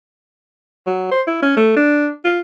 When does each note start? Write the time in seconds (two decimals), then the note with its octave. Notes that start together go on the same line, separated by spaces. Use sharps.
0.87 F#3
1.11 C5
1.27 E4
1.43 C#4
1.57 A3
1.76 D4
2.24 F4